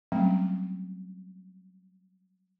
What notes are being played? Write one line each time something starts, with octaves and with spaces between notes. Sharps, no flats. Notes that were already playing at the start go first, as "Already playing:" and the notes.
F#3 G3 A3 C4 C#4